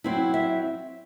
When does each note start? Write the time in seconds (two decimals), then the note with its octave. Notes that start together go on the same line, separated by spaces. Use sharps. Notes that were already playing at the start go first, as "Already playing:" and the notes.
0.04 F#3 C4 E4
0.34 E5